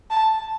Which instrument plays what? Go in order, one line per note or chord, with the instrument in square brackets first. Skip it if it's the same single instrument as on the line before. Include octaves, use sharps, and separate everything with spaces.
[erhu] A5